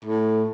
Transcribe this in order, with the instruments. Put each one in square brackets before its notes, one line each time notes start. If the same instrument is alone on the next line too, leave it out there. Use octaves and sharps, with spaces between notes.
[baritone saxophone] A2